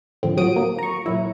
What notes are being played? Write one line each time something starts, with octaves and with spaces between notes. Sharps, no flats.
D#2 A2 D3 F3 C4
F3 F#3 F#4 D#6 D7
A#3
A#5 C#6
A#2 F#3 E4